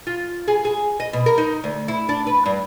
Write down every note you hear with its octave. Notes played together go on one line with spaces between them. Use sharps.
F4
G#4
G#4
D#5
B2
A#4
D#4
D2
E4
D4
B4
G2